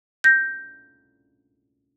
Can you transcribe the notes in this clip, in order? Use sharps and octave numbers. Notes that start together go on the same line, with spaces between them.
G6 A#6